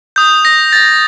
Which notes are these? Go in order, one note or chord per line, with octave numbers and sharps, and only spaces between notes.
D#6 G6
A#6
A6